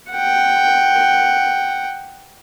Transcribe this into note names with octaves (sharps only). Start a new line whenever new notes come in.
F#5 G5